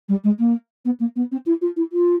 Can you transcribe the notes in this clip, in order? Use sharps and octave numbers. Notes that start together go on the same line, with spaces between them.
G3
G#3
A#3
B3
A#3
B3
C4
E4
F4
E4
F4